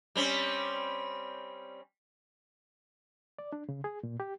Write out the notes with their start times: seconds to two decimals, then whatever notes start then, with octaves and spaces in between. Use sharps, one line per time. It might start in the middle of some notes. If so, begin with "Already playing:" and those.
0.15 G3 C4 C#4
3.39 D5
3.53 D4
3.69 C#3
3.84 G#4
4.03 A#2
4.20 G4